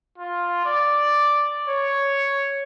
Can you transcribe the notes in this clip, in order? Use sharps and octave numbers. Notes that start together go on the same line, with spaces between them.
F4
D5
C#5